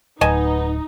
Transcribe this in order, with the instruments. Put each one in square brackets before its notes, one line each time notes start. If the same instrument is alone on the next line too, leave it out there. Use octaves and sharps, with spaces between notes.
[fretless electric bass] D1 [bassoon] B3 [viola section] D#4 [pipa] D#5 G#5 A5